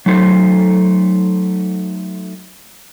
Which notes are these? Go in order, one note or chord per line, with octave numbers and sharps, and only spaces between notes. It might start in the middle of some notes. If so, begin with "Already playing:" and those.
F#3 A3 D#4 A4 C5